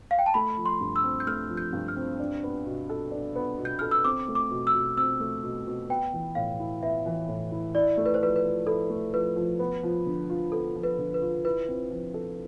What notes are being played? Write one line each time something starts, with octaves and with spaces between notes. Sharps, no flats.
F5
G5
A5
A3 B5
F3
C6
G2
E6
C4
G6
A3 F6
F3
G6
G2
F6
C4
D4
B3
B2
A4
D4
B3
B2
G6
A4 F6
E6
C4 D6
A3
D6
B2
E6
B2
C4 E6
A3
B2
B2
B3 G5
E3
A2 F5
E4
B3 E5
E3
A2
E4
E4 D5
A3
B4
C5
F3 B4
B4
F3
E4 A4
A3
F3 B4
F3
B3
F3
D3
F4
B3 A4
F3
B4
D3
B4
F4
E4 B4
C4
F3
A4